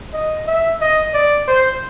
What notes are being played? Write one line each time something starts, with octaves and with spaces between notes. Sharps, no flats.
D#5
E5
D#5
D5
C5